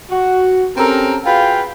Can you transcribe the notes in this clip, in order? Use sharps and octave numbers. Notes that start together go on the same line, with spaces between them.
F#4
C4 C#4 G4 A4 A#4
F4 F#4 G#4 B4 F5 G5